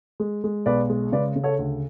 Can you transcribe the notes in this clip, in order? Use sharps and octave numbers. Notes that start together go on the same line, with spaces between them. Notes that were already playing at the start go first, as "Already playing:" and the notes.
G#3
G#3
B1 B4 D5
G#3
C#3 B4 D5
C#3
A4 C#5
D2